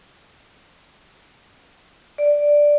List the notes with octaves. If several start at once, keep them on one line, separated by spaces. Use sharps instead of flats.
D5